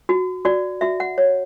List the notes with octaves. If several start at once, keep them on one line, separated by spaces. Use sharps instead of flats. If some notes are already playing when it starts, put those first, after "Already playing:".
F#4
F#4 D5
F#4 E5
F#5
C#5